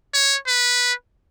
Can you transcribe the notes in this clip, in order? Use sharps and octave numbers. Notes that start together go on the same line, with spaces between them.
C#5
B4